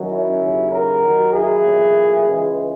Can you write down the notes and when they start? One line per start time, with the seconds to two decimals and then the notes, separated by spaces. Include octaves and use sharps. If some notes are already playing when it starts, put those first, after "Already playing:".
Already playing: F#2 D#3 F#3
0.10 C#4 E4
0.41 D#2 C#3 F#3
0.71 F#4 A#4
1.03 D#2 D#3 F#3
1.33 E4 G#4
1.64 B1 A#2 F#3
2.26 C#2 C#3 E3 G#3